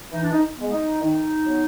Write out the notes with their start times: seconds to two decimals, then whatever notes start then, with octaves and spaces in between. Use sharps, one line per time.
0.12 E3 D#4
0.22 D4
0.32 D#4
0.57 G#3 B3
0.72 D#4
1.01 D#3 D#4
1.46 F#3 B3